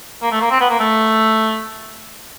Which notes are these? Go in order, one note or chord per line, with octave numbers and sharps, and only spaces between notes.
A#3
A3
A#3
C4
B3
A#3
A3